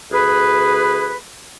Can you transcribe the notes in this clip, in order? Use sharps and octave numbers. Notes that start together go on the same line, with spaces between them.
D2 G#4 B4